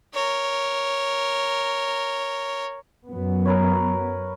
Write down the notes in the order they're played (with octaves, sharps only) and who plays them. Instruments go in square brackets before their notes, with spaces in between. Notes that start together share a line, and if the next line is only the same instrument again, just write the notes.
[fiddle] A#4 C#5
[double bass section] F#2 F#3 B3
[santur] A#4 B4 C#5